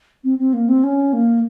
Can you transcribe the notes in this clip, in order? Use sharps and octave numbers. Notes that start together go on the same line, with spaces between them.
C4
C4
A#3
C4
C#4
A#3